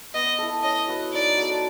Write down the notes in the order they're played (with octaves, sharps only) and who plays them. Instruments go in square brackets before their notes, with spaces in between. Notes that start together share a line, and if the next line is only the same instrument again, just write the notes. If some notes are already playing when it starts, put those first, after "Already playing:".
[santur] B3 [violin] D#5
[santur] E4 A4
[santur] C#4 [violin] D#5
[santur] F#4 B4
[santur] D#4 [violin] D5
[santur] F#4 A4